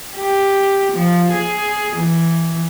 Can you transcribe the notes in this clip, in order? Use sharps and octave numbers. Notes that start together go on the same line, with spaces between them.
G4
F3
G#4
E3